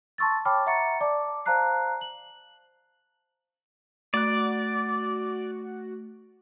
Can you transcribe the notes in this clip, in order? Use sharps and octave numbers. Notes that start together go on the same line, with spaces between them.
A5 C6 C#6 E6 A6
C#5 G5 A5 B5 D6 F6
E5 F#5 A#5 C#6 A6 C#7
D5 A5 D6
C5 F5 A5 A#5 F#6 C7
F#7
A3 F#4 D5 F#6